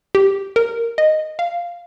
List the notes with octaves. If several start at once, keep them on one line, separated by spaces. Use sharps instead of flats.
G4
A#4
D#5
F5